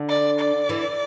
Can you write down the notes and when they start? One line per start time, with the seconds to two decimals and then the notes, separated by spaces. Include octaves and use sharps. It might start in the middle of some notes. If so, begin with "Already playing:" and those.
Already playing: D3
0.09 D5
0.39 D5
0.69 E3